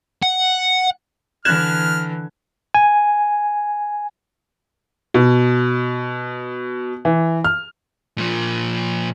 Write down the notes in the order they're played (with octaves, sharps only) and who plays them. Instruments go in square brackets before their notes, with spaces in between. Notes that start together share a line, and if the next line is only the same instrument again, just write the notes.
[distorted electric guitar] F#5
[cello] D3 E3 [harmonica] F6 [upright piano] F#6 G#6 E7
[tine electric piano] G#5
[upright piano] B2
E3
F6
[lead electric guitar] A#2 F3